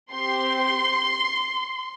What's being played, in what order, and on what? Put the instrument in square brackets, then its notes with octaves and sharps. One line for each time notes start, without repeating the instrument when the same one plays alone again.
[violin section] C4 G4 C6